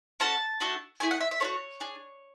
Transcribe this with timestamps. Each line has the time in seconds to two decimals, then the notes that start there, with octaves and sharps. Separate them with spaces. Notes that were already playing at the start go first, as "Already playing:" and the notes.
0.20 C#4 F#4 A4 A5
0.60 A3 D4 F#4 A4
1.00 A3 E4 G#4 G#5
1.11 F#5
1.20 E5
1.31 E5
1.40 A3 D4 F#4 C#5
1.80 D4 G#4